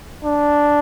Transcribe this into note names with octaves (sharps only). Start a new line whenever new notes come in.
D4